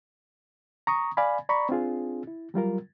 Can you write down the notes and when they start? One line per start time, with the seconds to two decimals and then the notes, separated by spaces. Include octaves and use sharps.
0.87 A#5 C#6 D#6
1.17 D5 F5 G#5 B5
1.49 D5 A#5 B5 C#6
1.69 C4 D4 F4 G#4
2.27 E4
2.54 F#3 G3 F4 A#4